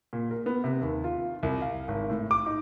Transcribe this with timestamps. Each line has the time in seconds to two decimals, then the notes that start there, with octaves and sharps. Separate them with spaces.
0.13 A#2
0.31 A#4
0.46 B3
0.64 C3
0.81 D#2
1.04 F4
1.43 C2
1.62 F5
1.88 G#1
2.10 A2
2.31 D6
2.46 D#4